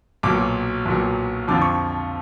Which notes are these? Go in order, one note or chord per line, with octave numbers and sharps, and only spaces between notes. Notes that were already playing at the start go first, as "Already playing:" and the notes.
B1 A#2 F#3 D6
B1 A#2 F#3
F2 D3 F3 D6
C#6